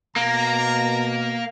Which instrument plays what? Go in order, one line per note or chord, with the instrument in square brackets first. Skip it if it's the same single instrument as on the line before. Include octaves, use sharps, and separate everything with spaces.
[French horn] B2 [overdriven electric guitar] A#3 [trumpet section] A#5